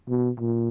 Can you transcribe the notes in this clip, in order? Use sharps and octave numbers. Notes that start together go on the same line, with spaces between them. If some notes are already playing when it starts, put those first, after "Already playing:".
B2
A#2